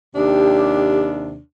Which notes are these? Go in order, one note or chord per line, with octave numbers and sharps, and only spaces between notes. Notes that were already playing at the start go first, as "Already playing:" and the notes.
D#2 C3 D4 G4